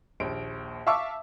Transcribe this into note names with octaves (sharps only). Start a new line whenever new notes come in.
A#1 D#2 D7
E5 F5 A5 C#6 D6 E6